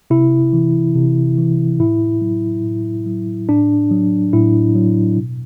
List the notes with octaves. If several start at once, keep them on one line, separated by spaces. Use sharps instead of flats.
C3 E4
E3
C3
E3
A2 E4
F#3
A2
F#3
A2 D4
F#3
A2 E4
F#3
B2